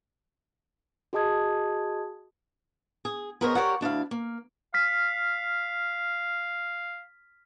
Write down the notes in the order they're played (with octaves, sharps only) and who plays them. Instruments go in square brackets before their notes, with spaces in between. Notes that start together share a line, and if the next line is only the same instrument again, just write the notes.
[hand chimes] F#4 G#4 D#5 A5 D#6 G#6
[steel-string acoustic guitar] G#4
B3 G#4 A#4 C5 C#5 D#5
G4 A#4 C#5 D5 F#5
D2 D4 E4 F5
A#3
[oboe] F5 [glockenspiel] F6 B6